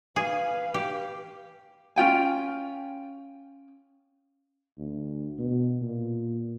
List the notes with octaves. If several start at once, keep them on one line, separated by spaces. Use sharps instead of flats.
G#4 B4 F5
G4
C#4 F4 G5 G#5
D2
B2
A#2